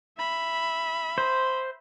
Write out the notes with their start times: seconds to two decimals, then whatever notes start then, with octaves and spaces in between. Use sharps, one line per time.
0.18 E5 B5
1.18 C5